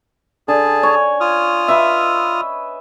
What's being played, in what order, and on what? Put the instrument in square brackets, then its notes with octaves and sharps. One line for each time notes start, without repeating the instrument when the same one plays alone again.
[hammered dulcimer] D3 [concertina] G#4 A5
[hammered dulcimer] C#5 G#5
[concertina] F4 D#6 F6
[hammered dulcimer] B4 D#5 E5